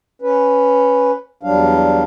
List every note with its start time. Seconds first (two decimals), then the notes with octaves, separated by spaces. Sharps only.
0.22 C#4 B4
1.43 E2 F#3 G3 D4 F5